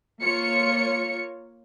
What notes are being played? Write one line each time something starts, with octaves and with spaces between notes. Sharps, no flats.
A#3 F4 C#5 C#7